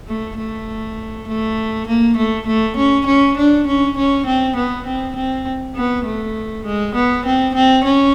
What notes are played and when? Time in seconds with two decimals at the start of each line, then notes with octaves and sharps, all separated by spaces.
0.08 A3
0.38 A3
1.28 A3
1.87 A#3
2.17 A3
2.47 A3
2.77 C#4
3.07 C#4
3.37 D4
3.67 C#4
3.97 C#4
4.27 C4
4.56 B3
4.86 C4
5.16 C4
5.76 B3
6.05 A3
6.66 G#3
6.95 B3
7.26 C4
7.55 C4
7.84 C#4